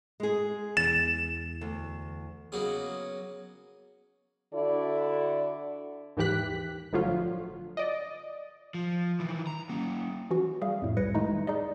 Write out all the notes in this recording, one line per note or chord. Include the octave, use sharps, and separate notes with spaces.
G#3 G#4
E2 A6 E7
D2
C#3 F#3 A#3 B3 D#4 G#4
D3 E4 F#4 A4 D5
D#2 G#2 E3 G4 F#6 B6
G1 A2 D3 F3 F#3 F4
D5 D#5
F3
D#3 E3
A#5
A#3 C#4
E3 C#4 F#4
G3 G#4 E5 F5
F2 A2
C2 G3 B4 G#6 A#6 C#7
D#3 G#3 A3 D#4 E4
D#4 G#4 D5 D#5